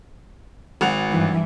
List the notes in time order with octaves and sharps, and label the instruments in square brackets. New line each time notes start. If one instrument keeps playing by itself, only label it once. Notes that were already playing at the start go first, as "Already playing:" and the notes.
[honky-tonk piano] G#1 F#5 F7
[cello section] G2 E3